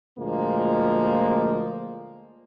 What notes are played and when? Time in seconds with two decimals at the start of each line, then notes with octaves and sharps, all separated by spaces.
0.18 D2 A#2 F3 G#3 A#3